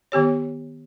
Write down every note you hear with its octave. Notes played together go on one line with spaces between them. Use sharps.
D#3 B3 G4 C#5